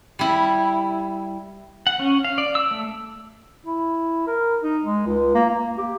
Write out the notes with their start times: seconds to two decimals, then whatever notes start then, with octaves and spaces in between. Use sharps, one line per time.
0.19 G3 E4
1.87 F#5
2.00 C#4
2.24 F5
2.38 D5
2.55 E6
2.71 A3
3.66 E4
4.27 A#4
4.63 D#4
4.84 G#3
5.06 C#2
5.35 A#3
5.50 A#3
5.78 G4